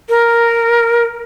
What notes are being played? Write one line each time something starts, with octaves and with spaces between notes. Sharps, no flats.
A#4